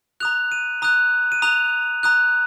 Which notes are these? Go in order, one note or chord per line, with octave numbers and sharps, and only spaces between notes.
A#5 D#6 F#6 F7
D#7
A#5 D#6 F#6
D#7
A#5 D#6 F#6 F7
A#5 D#6 F#6